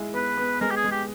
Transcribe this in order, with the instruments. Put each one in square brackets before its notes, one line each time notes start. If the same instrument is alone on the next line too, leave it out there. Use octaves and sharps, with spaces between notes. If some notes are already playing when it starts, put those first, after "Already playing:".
Already playing: [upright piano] G#3 E4
[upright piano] B3 [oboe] B4
[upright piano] B3
[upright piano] G#3 [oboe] A#4
[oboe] G4
G#4
[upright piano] G#3
[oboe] G4